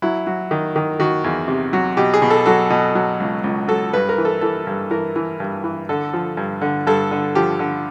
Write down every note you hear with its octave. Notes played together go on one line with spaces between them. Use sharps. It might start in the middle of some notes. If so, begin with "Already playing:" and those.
F#3 E4
F#3
D#3
D#3
D#3 F#4
E2
C3
F#3
B2 G4
G#4
B2
A4
F#3 A4
B2
F#3
C#2
C#2
F#3 A4
G2 B4
A#4
E3
A4
E3 A4
G2
E3 A#4
E3
G2
E3
D3 A4
F3
G2
D3
G2 A4
D3
F3 G4
D3